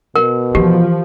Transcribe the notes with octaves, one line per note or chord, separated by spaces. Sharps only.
B2 A#4
E3 F3 G4